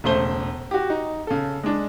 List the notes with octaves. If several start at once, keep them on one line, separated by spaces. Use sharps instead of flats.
E1 C#3 A3 C5 G7
F#4 G4
D#4
C#3 A4
G#3 D4